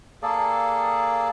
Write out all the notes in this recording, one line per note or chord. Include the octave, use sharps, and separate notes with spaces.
A#3 G#4 A4 D5